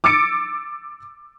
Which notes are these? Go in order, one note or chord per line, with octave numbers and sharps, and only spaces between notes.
D6 E6 A6 C#7 D7